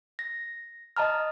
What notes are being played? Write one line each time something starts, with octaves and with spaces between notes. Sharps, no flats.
A#6
D#5 A5 A#5 F6